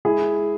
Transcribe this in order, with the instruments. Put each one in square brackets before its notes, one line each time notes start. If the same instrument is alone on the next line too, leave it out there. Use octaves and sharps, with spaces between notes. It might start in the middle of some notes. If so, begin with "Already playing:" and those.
[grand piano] G#3 E4 G#4